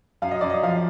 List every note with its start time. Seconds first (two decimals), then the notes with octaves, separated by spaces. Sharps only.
0.22 F#2 F5
0.31 D#5
0.41 F#2 D5
0.50 D#5
0.63 F3 F5